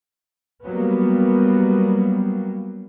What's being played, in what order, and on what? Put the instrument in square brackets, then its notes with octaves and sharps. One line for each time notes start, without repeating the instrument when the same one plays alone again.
[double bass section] F#3 G3 A#3 B3